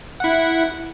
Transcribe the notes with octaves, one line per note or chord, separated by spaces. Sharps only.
E4 F#5